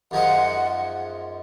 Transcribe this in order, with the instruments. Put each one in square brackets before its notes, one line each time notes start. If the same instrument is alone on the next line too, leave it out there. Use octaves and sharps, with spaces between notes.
[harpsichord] F#2 F3 G#3 D#4 G#4 [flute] F#5